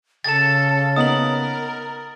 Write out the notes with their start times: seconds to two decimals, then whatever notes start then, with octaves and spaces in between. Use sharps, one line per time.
0.24 C#3 A4 A6 E7
0.96 B3 D#4 A#4 D#6 F#7